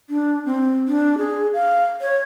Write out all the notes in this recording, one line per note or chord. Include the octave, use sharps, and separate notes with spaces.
D4
C4
D4
G#4
F5
C#5